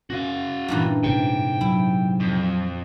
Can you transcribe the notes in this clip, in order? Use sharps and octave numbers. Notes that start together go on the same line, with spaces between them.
C#4 F#4 F5
G2 A#2 E3
G#2 C3 G5
F#3 E4
F2